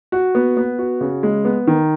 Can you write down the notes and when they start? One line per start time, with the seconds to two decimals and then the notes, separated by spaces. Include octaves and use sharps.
0.12 F#4
0.35 B3
0.57 B3
0.79 F#4
1.01 C#3
1.23 G#3
1.45 B3
1.67 D#3